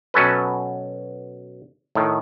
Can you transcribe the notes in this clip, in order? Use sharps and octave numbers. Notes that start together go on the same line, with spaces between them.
B2 F#3 C#4 A4 B4
A2 D#3